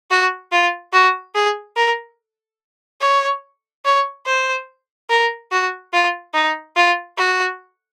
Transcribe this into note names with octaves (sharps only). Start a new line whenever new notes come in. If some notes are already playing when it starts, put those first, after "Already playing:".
F#4
F4
F#4
G#4
A#4
C#5
C#5
C5
A#4
F#4
F4
D#4
F4
F#4